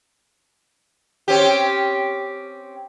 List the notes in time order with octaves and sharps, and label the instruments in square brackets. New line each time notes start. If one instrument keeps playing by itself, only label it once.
[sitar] C4 C#4 G4